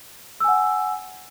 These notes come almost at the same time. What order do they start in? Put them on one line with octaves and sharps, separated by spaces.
E6 G#5 F#5